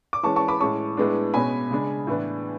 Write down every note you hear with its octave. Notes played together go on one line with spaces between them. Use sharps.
D6
E3 G#3 C#4 A5 C#6
A5 C#6
B5 D6
A2 G#3 C#4 A5 C#6
A2 G#3 B3 D4
B2 G#3 C#4 G#5 B5
C#3 G#3 D4
A2 E3 B3 D4